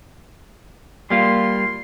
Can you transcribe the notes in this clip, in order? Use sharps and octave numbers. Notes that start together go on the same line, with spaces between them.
G3 A#3 F4 C6